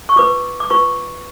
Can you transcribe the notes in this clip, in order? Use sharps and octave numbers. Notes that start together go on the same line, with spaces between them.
C#6
F4 B4 D6
D6
F4 B4 C#6